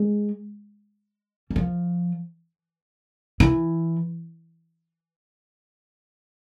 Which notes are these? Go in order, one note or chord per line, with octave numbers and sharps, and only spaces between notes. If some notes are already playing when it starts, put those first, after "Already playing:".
Already playing: G#3
E3
F3
E3